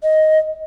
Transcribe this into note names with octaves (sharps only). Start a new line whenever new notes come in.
D#5